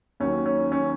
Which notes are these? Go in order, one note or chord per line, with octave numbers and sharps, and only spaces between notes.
D#2 D#3 F#3 C#4
C#4
C#4